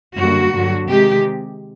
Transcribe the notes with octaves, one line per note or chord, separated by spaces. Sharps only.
F#2 D3 G3 A#3 F#4
G2 D3 F#3
C3 D#3 G#3 G4